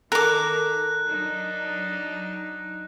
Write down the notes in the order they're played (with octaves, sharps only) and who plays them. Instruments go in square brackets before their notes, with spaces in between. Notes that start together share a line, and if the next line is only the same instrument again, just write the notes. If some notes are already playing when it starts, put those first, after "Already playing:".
[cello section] D#3 [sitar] A4 [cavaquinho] A#4 D6 [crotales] F#6
[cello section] F#3 D4 D#4